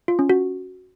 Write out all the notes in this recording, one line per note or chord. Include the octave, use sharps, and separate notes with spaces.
F4
C#4
F#4